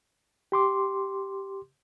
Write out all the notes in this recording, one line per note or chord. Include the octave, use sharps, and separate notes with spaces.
G4 C6 D6